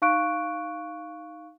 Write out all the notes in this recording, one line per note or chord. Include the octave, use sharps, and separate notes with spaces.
D#4 F5 C#6 F#6 D7